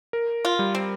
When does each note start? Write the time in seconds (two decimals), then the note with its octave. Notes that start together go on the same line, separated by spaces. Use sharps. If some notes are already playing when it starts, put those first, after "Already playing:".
0.13 A#4
0.45 F4
0.59 G3
0.75 C4